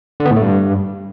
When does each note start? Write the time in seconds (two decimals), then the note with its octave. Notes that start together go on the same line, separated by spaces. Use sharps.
0.20 D3
0.25 B3
0.31 A2
0.36 A3
0.42 G2